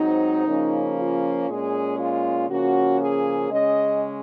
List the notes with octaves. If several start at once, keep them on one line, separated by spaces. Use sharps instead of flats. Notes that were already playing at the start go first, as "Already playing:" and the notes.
Already playing: G#2 F#3 C4 D#4
C#3 F3 A#3 C#4
F4
A#2 G#3 C#4 G#4
F4
C#3 F3 A#3 C#4 F#4
G#4
C#3 G#3 C#4 D#5